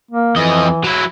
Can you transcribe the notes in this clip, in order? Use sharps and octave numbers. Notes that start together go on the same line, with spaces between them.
A#3
F2 E3 D#5
F#3 E4